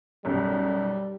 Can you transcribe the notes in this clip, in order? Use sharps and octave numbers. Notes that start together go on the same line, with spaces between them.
B1 F#2 G3